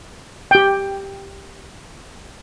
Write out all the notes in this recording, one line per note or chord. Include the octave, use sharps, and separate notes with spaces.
G4 G5